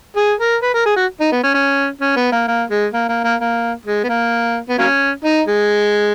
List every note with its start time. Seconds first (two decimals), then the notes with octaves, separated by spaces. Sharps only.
0.16 G#4
0.40 A#4
0.62 B4
0.74 A#4
0.86 G#4
0.97 F#4
1.20 D#4
1.32 B3
1.43 C#4
1.55 C#4
2.01 C#4
2.16 B3
2.32 A#3
2.47 A#3
2.70 G#3
2.93 A#3
3.09 A#3
3.24 A#3
3.40 A#3
3.86 G#3
4.04 B3
4.09 A#3
4.69 B3
4.78 F#3 A#3 C#4
5.25 D#4
5.47 G#3